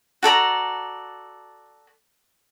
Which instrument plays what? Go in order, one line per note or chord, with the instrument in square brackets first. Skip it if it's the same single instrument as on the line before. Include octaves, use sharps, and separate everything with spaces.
[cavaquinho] F#4 A4 D5 A#5